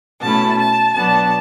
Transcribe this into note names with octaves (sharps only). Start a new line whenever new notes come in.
B2 A3 C#4 E4 A5
A5
B2 F#3 B3 D4 A5